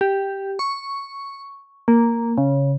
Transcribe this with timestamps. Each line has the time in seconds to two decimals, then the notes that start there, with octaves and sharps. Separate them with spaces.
0.01 G4
0.59 C#6
1.88 A#3
2.38 C#3